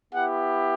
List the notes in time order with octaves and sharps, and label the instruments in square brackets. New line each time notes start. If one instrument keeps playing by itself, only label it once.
[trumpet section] B3 E4 G4 F#5